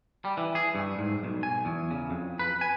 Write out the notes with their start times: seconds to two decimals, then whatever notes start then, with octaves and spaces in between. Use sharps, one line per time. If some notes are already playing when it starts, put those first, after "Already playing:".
0.25 G3
0.37 E3
0.55 G#4
0.75 G2
0.98 G#2
1.23 B1
1.43 G#5
1.65 E2
1.91 C#3
2.10 F2
2.39 B4
2.61 G#5